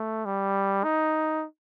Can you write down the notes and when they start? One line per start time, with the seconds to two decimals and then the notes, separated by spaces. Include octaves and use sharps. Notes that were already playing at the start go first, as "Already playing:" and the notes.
Already playing: A3
0.25 G3
0.84 D#4